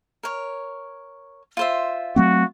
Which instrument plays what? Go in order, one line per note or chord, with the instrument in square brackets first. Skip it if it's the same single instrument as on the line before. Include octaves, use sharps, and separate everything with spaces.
[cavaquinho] A#4 C#5
F4 C5 E5
[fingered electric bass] F#3 A3 C4 [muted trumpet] F#4